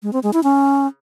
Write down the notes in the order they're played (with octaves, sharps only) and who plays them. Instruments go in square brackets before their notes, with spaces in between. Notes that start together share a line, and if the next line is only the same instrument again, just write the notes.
[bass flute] G#3
C4
G#3
E4
C#4